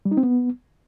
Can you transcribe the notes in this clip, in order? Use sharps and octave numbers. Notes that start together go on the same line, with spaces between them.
G3
D#4
C4
B3